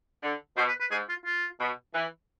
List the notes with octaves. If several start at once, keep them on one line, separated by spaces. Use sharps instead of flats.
D3
B2 C5
B4
B4
G#2 G#4
F4
F4
B2
E3